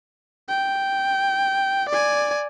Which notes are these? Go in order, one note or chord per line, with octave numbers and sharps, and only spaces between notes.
G5
D5 G#5